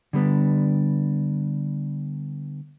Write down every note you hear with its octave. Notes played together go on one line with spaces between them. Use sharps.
D3 G3 B3 D4